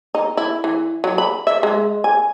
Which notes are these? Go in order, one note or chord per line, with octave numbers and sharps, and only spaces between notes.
D#4
E4
E3
F#3
B5
E5
G#3
G#5